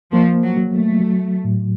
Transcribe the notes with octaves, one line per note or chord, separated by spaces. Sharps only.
F3 A#3
F#3
F#3
A3
F#3
A2